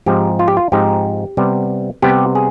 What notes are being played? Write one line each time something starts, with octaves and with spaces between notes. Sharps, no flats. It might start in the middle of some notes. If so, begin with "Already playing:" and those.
G#2 F3 C4 D#4 G4
F4
G4
F4
G#2 F3 C4 D#4 G4
C3 G3 B3
C3 G3 B3 G4
G#4